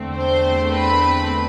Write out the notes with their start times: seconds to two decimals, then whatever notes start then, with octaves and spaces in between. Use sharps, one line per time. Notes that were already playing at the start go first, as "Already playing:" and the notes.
Already playing: E2 D3 A3 C4
0.17 C5 C6
0.72 B4 B5